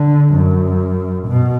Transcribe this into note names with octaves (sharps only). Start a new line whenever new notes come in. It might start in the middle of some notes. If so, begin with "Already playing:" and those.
Already playing: D3
F#2
B2